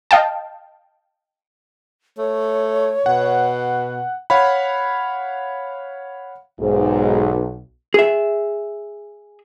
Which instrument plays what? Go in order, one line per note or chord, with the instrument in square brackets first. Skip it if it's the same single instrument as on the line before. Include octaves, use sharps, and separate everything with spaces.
[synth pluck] D#5 F5 G5 A5
[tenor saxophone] A3 [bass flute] C#5
[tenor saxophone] B2 [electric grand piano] F#5
[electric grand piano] C#5 F5 F#5 B5
[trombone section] B1 [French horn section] G#2
[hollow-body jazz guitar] G#4 E5